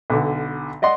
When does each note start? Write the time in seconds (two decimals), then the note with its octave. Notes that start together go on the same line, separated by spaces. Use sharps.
0.10 B1 D3
0.82 D5 D#5 F#5 C6